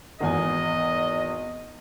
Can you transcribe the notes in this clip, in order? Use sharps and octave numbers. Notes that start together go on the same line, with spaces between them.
G#1 E2 D#5 G#5